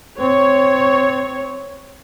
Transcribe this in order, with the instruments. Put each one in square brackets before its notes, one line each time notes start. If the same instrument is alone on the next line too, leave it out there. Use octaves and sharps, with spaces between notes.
[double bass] C4 [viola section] C#5